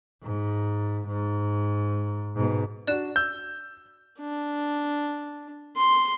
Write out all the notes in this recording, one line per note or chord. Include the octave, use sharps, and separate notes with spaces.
G#2
G#2
G#2 B2
D4 F#4 D5 F#6 E7
E6 G6
D4
C6